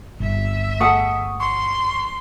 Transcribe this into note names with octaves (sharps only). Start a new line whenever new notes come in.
G1 E5
A3 G#4 F#5 A5 C#6 D#6
C6 C#6